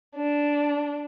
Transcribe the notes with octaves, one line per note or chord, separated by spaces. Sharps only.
D4